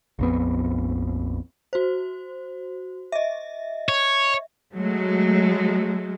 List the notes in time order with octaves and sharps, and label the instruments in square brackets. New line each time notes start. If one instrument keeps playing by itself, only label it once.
[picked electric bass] A#1 F2 B3
[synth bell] F#4 C5
D#5 E5
[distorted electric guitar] C#5
[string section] F#3 G#3 A3